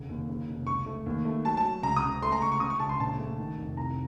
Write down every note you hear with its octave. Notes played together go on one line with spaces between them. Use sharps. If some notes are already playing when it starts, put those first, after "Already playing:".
Already playing: F1 C#3
D#2
C#3
F1
C#2 C#6
A3
D#2
A3
F#3 A5
A5
F#3
C#2 A#5
D#6
C#2
A3 C6
A#5
C#2 C#6
C#6
C#3 D#6
C#6
C#2 A5
C6
A#1 A5
A3
D#3
F1
C2 A#5